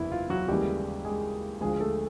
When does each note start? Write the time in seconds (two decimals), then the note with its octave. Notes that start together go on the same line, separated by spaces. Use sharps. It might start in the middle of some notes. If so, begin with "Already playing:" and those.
Already playing: F#1 E2 C3 E4
0.12 F4
0.30 F#3 F#4
0.48 D#2 C#3 E3 G3 G#3 G4
1.05 G#3 G#4
1.61 D2 D3 F3 G#3 G#4
1.80 A3 A4